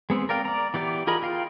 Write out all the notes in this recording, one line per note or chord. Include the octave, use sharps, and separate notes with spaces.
G#3 B3 C4
A#4 D5 F5 G5
D5 A#5
E3 B3 G4 D5
F4 G#4 A#4 D#5 B5
F4 F5 G5